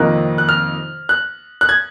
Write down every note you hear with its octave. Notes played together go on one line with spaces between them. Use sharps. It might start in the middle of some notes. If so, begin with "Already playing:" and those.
Already playing: F2 C3 D#3 A#3 D#4 F#6
F#6
F6
F#6
F#6
G#6